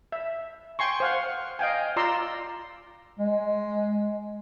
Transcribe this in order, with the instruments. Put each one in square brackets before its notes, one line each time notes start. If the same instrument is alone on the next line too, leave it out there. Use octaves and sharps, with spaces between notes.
[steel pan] E5
G5 G#5 C6 C#6
C5 F5 F#5
D#5 F5 G5 G#5
F4 D5 A#5 C6 E6
[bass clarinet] G#3